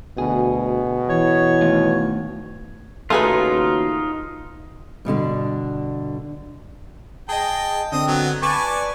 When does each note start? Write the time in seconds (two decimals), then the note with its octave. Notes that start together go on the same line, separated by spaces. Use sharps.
0.18 D2 B2 G#4
1.09 E3 C#5
1.62 D#3 A3 F5
3.10 D#2 C#3 A3 D#4 F4 F#4 G#4 B4
5.05 G2 B2 D3 D4
7.29 G#4 D#5 G5 A5
7.92 D3 C4 D#5
8.08 F#3 B3
8.42 B4 D5 G#5 A5 C#6 D6